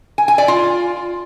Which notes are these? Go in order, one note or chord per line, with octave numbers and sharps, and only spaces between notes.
G#5
G#5
D5
F4